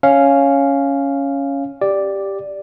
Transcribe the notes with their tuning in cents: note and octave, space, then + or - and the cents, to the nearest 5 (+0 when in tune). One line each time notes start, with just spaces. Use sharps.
C#4 +0 F5 -5
G4 +0 D5 +0